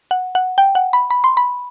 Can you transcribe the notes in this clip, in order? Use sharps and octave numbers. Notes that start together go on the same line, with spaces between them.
F#5
F#5
G5
F#5
B5
B5
C6
B5